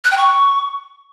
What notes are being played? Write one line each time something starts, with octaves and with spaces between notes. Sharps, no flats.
F#6
G5
C#6